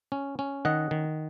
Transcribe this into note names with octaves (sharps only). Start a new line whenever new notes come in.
C#4
C#4
D#3 D#5 F#5
D#3